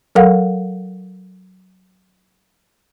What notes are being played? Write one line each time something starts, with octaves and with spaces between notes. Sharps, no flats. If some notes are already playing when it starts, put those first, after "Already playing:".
F#3 A4 A#4 F5 F#5